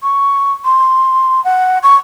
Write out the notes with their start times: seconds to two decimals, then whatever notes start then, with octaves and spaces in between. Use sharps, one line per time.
0.03 C#6
0.65 C6
1.44 F#5
1.83 C#6